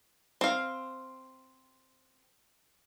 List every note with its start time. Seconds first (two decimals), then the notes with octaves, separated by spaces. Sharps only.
0.41 C4 F5